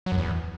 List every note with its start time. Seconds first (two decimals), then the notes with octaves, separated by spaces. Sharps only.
0.06 F#3
0.12 F#2
0.18 E2